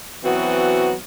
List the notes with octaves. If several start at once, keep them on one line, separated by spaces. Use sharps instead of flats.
E3 F#3 B3 C4 F#4